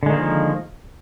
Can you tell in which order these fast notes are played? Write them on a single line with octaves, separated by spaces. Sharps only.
D3 G#3 D#3 A#3 F3